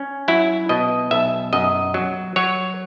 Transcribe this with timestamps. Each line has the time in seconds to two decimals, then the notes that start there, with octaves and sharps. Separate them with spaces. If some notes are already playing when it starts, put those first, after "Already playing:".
Already playing: C#4
0.28 F#3 E4
0.69 B2 D#5
1.11 B1 E5
1.53 F#2 D#5
1.94 F#3
2.36 F#3 C#5